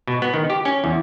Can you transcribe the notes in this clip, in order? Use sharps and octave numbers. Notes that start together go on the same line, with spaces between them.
B2
B3
D#3
G4
C#4
E2